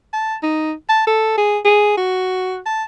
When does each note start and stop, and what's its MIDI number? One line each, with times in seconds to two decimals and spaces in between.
0.13 0.35 81
0.43 0.72 63
0.89 1.03 81
1.07 1.35 69
1.38 1.59 68
1.65 1.97 68
1.97 2.59 66
2.66 2.83 81